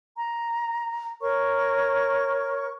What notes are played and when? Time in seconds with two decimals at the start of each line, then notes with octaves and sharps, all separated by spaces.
0.17 A#5
1.22 A#4 C#5 C#6